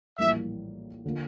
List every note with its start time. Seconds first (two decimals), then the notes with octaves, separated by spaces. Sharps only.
0.18 A#1 A2 E3 G3 A#3 E5
1.05 D3 F3 A#3